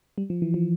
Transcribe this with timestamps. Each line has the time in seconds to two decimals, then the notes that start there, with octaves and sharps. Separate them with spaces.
0.18 G3
0.30 F3
0.42 E3
0.54 F3